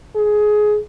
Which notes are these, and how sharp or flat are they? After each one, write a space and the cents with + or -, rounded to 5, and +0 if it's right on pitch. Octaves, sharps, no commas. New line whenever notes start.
G#4 +15